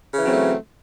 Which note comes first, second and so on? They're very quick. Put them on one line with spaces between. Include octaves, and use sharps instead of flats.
C#3 E3 F#3 C4 A3